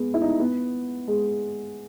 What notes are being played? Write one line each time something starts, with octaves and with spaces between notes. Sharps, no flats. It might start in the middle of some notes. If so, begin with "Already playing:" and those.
Already playing: G#3 B3
E4
D#4
B3
G#3